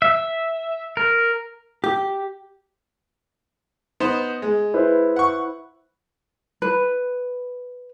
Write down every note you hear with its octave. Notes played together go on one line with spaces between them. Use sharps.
E5
A#4
G4
B3 D#4 C5
G#3
E4 B4 C5
F#5 C#6
B4